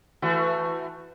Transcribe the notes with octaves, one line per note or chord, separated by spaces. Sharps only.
E3 A3 F#4